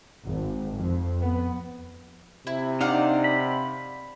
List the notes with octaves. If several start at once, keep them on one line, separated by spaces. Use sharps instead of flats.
G#1
F2
B3
C3 E4
D4 D#4 D5 F5 F#5
B5